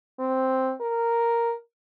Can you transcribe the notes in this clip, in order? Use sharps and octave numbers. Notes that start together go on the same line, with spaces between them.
C4
A#4